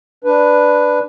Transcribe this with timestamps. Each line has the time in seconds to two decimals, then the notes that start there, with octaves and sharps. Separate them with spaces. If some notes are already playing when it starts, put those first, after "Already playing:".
0.24 D4 B4